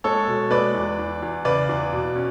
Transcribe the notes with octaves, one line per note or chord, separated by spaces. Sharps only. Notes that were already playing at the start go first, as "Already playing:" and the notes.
G#3 A4 C#5
B2
G#3 B4 D5
E2
E2
E2
C#3 B4 D5
E2
B2
C#4